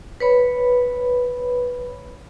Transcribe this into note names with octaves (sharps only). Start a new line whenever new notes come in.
B4 C#5 B5